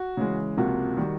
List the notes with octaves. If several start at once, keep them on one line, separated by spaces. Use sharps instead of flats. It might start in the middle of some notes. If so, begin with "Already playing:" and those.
Already playing: F#4
C#3 E3 G#3
C#2 C3 F3 A#3 F#4
D#3 G3